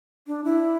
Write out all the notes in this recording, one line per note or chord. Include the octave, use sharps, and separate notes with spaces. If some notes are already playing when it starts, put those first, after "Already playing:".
D4
E4